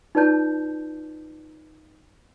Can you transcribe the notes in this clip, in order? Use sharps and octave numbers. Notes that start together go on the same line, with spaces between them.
D#4 F4 B4 D5 A5 G6